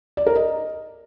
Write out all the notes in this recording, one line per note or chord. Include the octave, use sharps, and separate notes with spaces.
D5
A#4
D#5